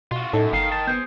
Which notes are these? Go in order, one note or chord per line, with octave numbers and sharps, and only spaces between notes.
B2 F4 F#4
F#2 A2 D#4 A4
G1 D#3 F5
A5
B3 G#4 C5